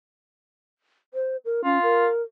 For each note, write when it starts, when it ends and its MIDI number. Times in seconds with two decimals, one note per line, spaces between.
1.14 1.37 72
1.45 1.61 70
1.64 1.78 61
1.64 2.06 65
1.82 2.22 70